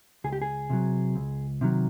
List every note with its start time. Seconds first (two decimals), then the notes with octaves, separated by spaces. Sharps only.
0.24 C#2 G#4
0.33 G4
0.42 G#4
0.70 C3 D#3 F#3
1.15 C#2
1.61 C3 D#3 F#3